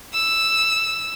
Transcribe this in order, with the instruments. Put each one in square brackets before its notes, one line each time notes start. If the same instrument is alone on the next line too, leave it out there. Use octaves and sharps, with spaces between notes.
[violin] E6